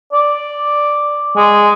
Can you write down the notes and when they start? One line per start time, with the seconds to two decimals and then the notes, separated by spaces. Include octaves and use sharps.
0.13 D5
1.36 G#3